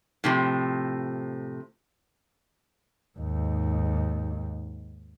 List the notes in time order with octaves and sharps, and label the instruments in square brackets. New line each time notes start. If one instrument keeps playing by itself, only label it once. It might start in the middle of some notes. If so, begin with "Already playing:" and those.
[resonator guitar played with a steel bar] A2 C3 F3
[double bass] D#2 G#2